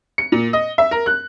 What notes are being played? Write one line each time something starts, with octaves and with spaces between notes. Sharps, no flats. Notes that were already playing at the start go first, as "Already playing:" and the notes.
C#7
A#2
D#5
E5
A#4
F#6